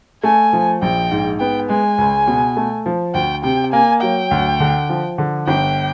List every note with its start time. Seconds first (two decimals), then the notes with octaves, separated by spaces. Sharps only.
0.23 A3 G#5
0.53 F3
0.82 A#1 G5
1.11 G#2
1.40 B3 G5
1.69 G#3 G#5
1.98 C#2
2.27 B2
2.57 A3
2.86 F3
3.14 D2 G5
3.44 C3 G5
3.73 A#3 G#5
4.02 F#3 G5
4.31 D2
4.60 D3
4.89 F3
5.18 D3
5.47 G1 G5